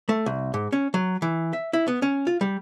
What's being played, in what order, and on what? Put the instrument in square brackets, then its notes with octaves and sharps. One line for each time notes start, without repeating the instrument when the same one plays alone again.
[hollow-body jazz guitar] A3
C2
G#2
C#4
F#3
E3
E5
E4
B3
C#4
F4
G3